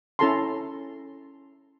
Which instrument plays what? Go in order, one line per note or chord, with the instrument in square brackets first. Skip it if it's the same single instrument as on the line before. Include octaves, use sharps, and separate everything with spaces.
[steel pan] C#4 E4 A4 A5 A#5 C6